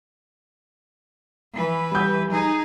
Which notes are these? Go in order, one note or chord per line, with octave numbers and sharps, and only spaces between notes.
E3 B4
G3 G6
D#4 G#4